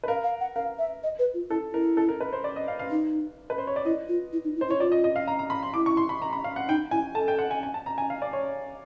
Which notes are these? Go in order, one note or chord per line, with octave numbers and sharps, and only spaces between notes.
B4
A#4 F5
F5
F#5
A#4 F5
E5
D#5
B4
F4
E4 A4
E4 A#4
A4
A#4
B4
C5
D5
D#5
F5
F5
D#4
B4
C5
C#5
D5
E4 D#5
F4
E4
D#4
E4
C5
E4 C#5
F4 D5
D#5
D#5
F5
A#5
A#5
B5
C6
E4 D6
C#6
C6
B5
A#5
B5
F5
F#5
D#4 G5
E4 G#5
A4 A5
G5
F#5
G#5
G#5
A5
A#5
G#5
F5
D5
C#5